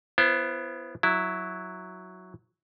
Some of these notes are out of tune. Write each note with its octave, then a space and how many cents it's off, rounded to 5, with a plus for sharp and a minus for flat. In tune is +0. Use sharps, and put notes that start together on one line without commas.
B3 +0 E4 +35 C5 +10
F#3 +0 E4 +0